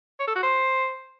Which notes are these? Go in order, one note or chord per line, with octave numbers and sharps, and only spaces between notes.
C#5
A4
F#4
C5